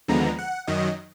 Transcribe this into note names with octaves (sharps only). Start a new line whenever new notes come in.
D#2 D3 F3 G#3 B3 A#5
F#5
F#2 D#3 F#3 D#5